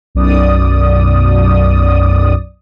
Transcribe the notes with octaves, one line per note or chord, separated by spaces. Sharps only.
B1 F#2 D5 D#6